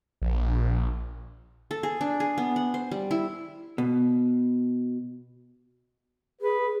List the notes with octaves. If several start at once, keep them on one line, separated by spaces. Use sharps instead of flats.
A#1
A4
G#4
D4
G#4
B3
F#5
C5
G3
E4
B2
G#4 B4